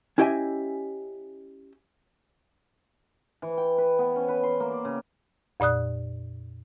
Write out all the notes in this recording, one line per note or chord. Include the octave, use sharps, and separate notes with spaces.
C#4 E4 G4 D#5 E5 G#5
E3
G5
B4
B3
C#4
B4
C6
A#3
D5
C#3
F2 A#2 D5 D#6 F#6